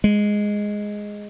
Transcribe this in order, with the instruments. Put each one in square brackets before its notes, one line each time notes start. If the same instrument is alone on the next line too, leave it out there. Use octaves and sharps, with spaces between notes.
[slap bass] G#3